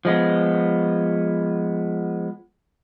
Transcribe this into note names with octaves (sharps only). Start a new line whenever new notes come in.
F3 G#3 B3